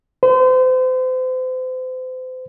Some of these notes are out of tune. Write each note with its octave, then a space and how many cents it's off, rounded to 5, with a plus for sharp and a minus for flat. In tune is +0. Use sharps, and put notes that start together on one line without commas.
C5 -35